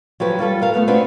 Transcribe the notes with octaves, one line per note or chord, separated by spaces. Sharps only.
F3 F#3 G4 B4
G3 F4 A4 B4
A#4 F5
A3 B3 B4
C4 D4 F4 F#4 B4 C5